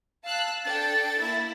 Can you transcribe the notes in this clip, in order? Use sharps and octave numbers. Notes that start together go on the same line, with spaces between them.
F5 A5 E6 F#6
D4 A4 G5 A6
A#3 E4 E5